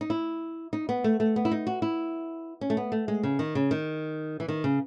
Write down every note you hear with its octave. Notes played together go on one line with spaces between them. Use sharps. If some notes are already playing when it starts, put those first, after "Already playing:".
D#4
E4
D#4
B3
A3
A3
B3
E4
D#4
F#4
E4
C#4
A3
B3
A3
G#3
C#3
D#3
C#3
D#3
E3
D#3
C#3